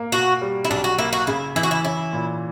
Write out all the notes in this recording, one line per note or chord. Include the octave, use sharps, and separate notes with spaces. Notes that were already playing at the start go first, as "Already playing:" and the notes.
Already playing: A#3
B2 F#4
G3
E4
B1 D4
F#4
A#3 E4
F#4
C#3 E4
E3 E4
F#4
E4
C#4 E4
A#2